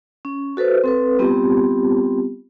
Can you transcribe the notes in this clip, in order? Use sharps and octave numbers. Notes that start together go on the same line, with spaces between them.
C#4
F#4 A4 B4 C5
C4 A4 B4
G3 B3 C4 F4 G4